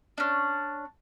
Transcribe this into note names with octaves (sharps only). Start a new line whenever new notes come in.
C#4 D4